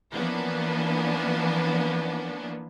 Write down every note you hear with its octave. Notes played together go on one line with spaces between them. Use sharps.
E3 F3 A#3 B3 C#4 D4